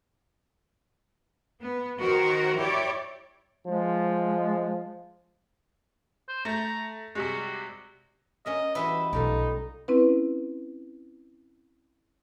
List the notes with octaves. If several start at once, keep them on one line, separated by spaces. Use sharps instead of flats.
B3
D#3 F#4 A#4 C5
E4 G4 C#5 D5
F3 G#3
C5
A3 A#5
C3 G3 G#3 F#4
C#4 A#4 D#5 E5
E3 G3 F#4 B4 C5 D#5 E5
B1 G3 A3 D#4 F4
C4 C#4 E4 B4